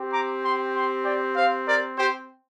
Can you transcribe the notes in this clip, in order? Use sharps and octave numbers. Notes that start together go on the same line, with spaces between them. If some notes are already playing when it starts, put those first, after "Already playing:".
Already playing: C4 G4
A#5 D6
G5 C6
G5 C6
D5 G5
C5 F5
A#4 D5
G4 C5